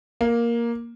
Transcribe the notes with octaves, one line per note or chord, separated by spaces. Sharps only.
A#3